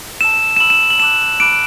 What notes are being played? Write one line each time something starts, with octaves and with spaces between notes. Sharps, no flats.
A5 E6 E7
E7
B5 E6 F#7
E7
F#7
A5 D6 F#6 E7
B5 D6 F#6 D7